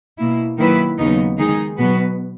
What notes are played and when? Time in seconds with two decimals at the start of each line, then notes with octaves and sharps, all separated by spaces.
0.18 B2 A#3 E4
0.57 D#3 F#3 A#3 E4 B4
0.98 D#2 C#3 F#3 B3 D#4
1.38 D#3 G#3 D#4 G#4
1.78 B2 F#3 B3 F#4 B4